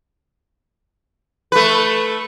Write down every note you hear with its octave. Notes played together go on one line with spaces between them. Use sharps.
A3 B4